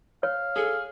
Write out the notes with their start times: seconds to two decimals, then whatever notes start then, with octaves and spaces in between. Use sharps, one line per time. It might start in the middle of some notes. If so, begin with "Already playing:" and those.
0.23 C#5 F5
0.56 G#4 A4